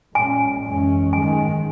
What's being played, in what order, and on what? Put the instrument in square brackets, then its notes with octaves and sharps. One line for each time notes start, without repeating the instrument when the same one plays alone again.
[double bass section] A#2 G#3 C#4 [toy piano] G#5
[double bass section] F#2 E3 G#3 C#4
[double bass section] G#2 D#3 G#3 [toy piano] G#5